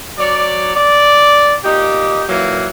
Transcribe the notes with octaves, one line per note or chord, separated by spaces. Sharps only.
F#3 C#5 D5
D5
A#2 D#4 G4
A#2 E3 F#3 A#3